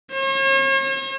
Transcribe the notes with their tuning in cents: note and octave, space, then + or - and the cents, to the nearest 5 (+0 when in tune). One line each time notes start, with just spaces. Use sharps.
C#5 -45